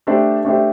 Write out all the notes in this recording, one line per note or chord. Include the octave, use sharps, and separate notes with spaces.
A3 D4 G4 C5 E5
A3 D4 G4 C5 E5